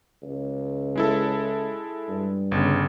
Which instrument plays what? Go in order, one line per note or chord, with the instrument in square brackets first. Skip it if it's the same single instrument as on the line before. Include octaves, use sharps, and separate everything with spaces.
[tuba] C#2
[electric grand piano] G#3 E4 A4
[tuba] G2
[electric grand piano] G1 C#3